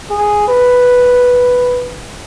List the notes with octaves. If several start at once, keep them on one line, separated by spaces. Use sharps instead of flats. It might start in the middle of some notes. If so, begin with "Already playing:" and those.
G#4
B4